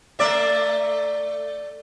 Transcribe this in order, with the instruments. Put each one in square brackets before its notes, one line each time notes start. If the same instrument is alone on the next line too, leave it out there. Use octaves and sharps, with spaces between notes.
[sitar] A3 D5 E5